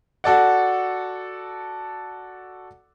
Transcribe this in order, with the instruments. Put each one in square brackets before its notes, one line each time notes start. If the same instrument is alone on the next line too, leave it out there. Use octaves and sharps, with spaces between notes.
[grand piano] F#4 A4 D5 F#5